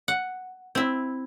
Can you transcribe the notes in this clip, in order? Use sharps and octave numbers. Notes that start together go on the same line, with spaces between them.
F#5
C4 E4